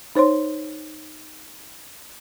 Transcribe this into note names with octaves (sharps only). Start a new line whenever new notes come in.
D#4 C5 C#5 C6